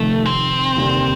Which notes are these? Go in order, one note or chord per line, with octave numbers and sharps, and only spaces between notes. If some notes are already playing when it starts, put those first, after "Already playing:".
Already playing: F1 F2 C3 D#3 A3
C4
F1 D#2 D3 G3 A#3